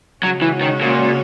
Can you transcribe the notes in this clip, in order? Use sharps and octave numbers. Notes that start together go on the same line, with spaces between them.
C#3 F#3 G#3 C#4 F#4
E3
D#3
A#2